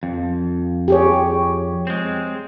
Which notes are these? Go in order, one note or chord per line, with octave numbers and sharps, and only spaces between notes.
F2
G4 G#4 C#5
G#3 C4